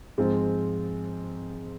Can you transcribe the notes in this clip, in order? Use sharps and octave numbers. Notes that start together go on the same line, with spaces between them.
G#2 F3 G#3 C4 F4